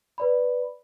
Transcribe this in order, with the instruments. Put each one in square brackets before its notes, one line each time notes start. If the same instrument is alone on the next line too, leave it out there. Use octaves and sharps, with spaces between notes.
[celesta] B4 D5 B5